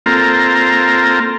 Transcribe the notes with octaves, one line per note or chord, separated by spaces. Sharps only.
A#3 C4 F4 A4 A#5